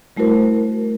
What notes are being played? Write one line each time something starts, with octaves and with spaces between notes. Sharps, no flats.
G3 A3 E4 F#4 A#4 C5